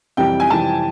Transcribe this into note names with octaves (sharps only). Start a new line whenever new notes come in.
F2 C3 E3 G3 G5
G#5
F2 C3 E3 G3 A5